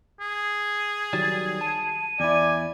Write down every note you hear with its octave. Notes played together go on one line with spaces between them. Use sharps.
G#4
D#3 F#3 G3 A6
A5 D#7
E2 E4 D5 G#5